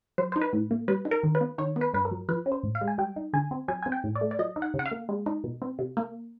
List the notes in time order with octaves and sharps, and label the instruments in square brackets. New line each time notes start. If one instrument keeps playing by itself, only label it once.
[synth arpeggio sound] F#3 C5
D#4 C5
B4
A2
A#3
G3 B4
D#4
A#4
D#3
B4
B3
D#3 C#5
B3
B4
G2 B4
A#4
F#3
F3 B4
C#4
C5
A2
F5
G#3
G#5
G3 G5
D#4
D3 G#5
C4
F#3 G#5
C4 G#5
G5
A2
D5
A3
D5
F#3 D#5
D#4
F#5
C#3
F#5
F5
A#3
G#3
D#4
B2
C4
C3
A#3